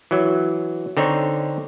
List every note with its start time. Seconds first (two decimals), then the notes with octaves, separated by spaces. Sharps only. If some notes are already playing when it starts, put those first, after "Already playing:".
0.11 E3 F#3
0.97 D3 C4 D#4 C#5